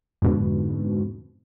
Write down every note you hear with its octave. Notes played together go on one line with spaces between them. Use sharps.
F2 G#2 B2 D3